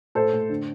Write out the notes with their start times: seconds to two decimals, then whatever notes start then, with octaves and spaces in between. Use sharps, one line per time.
0.15 A2 A4 C5
0.33 A2
0.49 D3